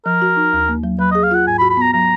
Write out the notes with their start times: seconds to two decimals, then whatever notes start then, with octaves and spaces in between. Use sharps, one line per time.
0.05 F3 A#4
0.22 F#4
0.37 D#4
0.53 D#2
0.68 A#3
0.84 F#3
0.99 F#3 B4
1.11 D#5
1.15 G#4
1.23 F5
1.31 F4 F#5
1.47 G#2 G#5
1.58 B5
1.62 F#4
1.70 B5
1.77 B3 A#5
1.93 F#3 A#5